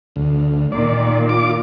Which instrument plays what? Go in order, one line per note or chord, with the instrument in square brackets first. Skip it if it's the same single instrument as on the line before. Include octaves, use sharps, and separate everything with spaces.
[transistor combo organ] D2
[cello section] A#2 D#3 [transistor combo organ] D5
[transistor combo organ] F4 D6